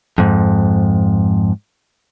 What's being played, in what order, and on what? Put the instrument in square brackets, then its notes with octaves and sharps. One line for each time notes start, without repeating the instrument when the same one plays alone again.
[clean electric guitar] F2 G#2